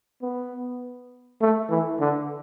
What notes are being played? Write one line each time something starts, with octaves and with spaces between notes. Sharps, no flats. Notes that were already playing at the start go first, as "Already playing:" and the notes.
B3
A3
E3
D3